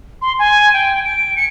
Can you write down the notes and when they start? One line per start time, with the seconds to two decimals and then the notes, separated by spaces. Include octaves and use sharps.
0.22 C6
0.39 G#5
0.74 G5
1.05 D7
1.36 C#7